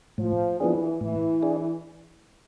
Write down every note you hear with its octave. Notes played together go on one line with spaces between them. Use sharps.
A2 F3
E3 F3 B3 D4 G#4
A2 E3
D4 G#4